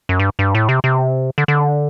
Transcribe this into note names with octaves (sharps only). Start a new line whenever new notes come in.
F#2
G2
G2
A2
C3
C3
D3
D3